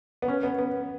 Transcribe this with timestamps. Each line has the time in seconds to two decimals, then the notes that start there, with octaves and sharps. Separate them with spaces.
0.22 B3
0.28 C#4
0.43 B3
0.59 B3